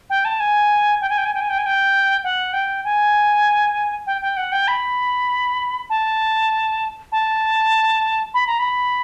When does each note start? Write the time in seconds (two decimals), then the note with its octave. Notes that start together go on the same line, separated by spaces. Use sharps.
0.10 G5
0.25 A5
0.40 G#5
1.01 G5
1.09 G#5
1.18 G5
1.25 G#5
1.34 G5
1.41 G#5
1.49 G5
1.58 G#5
1.66 G5
2.24 F#5
2.53 G5
2.84 G#5
4.07 G5
4.22 G5
4.37 F#5
4.52 G5
4.68 B5
5.90 A5
7.12 A5
8.34 B5
8.47 A#5
8.59 B5